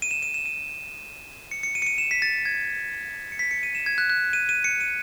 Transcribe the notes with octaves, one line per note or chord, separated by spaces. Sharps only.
D#7
E7
D#7
E7
D#7
C#7
C#7
D#7
C#7
D#7
E7
B6
A6
G#6
C#7
B6
C#7
D#7
E7
G#6
F#6
F#6
D#7
D#7
C#7
D#7